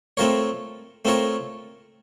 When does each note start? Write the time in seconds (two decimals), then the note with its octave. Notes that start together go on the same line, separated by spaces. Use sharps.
0.17 A3 C4 F4 A#4 C#5
1.05 A3 C4 F4 A#4 C#5